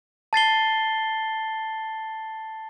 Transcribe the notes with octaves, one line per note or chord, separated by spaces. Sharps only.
A5 A6 C7 G7